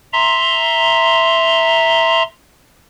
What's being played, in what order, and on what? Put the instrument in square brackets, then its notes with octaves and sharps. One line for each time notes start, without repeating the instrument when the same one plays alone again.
[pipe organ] E5 A#5 C6